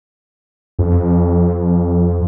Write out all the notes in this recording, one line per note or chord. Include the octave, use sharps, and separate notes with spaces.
F2